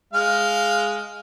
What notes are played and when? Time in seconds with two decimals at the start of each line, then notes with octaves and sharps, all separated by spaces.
0.13 G#3 F5